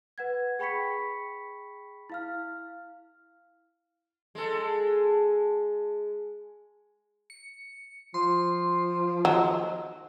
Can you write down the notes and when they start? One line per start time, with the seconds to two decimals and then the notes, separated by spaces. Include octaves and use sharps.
0.18 B4 F#5 G#6
0.59 G#4 G5 B5 C#6 B6 C#7
2.10 E4 F5 F6
4.35 G#3 A4
7.30 C#7
8.14 F3 C6
9.25 D#3 F#3